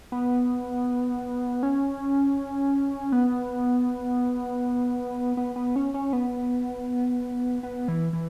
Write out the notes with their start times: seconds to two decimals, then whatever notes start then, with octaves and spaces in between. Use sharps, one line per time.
0.12 B3
1.63 C#4
3.12 B3
5.37 B3
5.56 B3
5.76 C#4
5.94 C#4
6.13 B3
7.63 B3
7.88 E3
8.13 E3